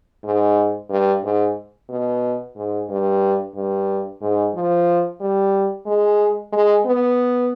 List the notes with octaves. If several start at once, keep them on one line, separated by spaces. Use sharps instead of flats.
G#2
G2
G#2
B2
G#2
G2
G2
G#2
F3
G3
G#3
G#3
B3